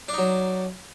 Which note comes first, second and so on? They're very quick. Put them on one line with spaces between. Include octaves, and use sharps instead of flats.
D4 D#4 F#3